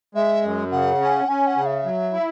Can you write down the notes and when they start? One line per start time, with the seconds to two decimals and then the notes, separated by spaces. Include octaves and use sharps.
0.15 G#3 E5
0.43 F#2
0.72 C#3 F#5
1.01 C#4
1.29 C#4 G#5
1.47 F#5
1.56 C#3
1.66 E5
1.85 F#3
2.13 E4